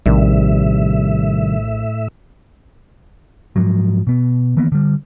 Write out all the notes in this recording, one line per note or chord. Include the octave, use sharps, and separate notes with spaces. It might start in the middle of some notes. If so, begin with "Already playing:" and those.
A#1 A2 C3 D#3 G3 E5
G#2 F3 F#3
B2 B3
D#3 E3 A#3 B3
D3 G3